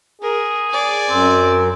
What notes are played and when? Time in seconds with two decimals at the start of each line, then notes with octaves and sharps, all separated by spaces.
0.22 G#4 A#4
0.69 D5 G#5
1.09 F#2 C4